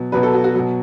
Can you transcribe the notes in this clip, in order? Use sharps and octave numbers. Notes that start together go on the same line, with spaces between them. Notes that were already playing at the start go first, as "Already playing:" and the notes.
Already playing: B2 F#3
B2 F#3 B4
A4
F#4
F#4
B2 F#3